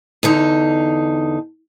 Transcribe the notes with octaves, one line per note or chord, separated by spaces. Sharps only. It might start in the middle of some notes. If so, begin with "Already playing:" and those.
E2 D3 D#4